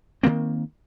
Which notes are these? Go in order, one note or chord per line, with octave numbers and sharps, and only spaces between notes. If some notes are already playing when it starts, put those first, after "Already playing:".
D#3 F3 A#3 C4